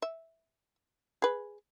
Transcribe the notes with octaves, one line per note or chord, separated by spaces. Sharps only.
E5
G#4 B4